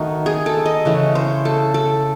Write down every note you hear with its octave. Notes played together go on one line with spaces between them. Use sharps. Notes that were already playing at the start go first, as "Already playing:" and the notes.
Already playing: D#3 A3 D#4 F#4
G#4
A4
D#5
C#3 E3 A3
C5
A4
A4